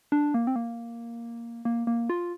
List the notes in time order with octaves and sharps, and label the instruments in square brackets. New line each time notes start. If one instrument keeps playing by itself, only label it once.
[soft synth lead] D4
A#3
C4
A#3
A#3
A#3
F4